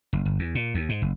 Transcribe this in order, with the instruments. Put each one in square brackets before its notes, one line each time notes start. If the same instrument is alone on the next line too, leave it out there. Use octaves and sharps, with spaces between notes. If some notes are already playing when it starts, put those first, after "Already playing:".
[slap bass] F#1
G1
E2
A#2
D#2
G#2
F#1